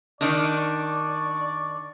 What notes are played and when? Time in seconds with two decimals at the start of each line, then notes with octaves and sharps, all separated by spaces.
0.21 D#3 D4 D5 C#6 D6